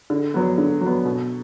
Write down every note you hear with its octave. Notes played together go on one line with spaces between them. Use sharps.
D3
F#3 B3
D3
F#3
B3
B2